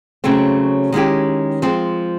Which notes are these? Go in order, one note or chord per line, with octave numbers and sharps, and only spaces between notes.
C#3 F#3 A3 C4
D#3 G#3 C#4 E4 G4
F3 G#3 C4